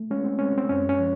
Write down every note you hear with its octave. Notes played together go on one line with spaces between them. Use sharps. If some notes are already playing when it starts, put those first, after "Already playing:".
Already playing: A3
G#3 C#4
C4
G#3 C#4
C4
F#2 C#4
C#4
F3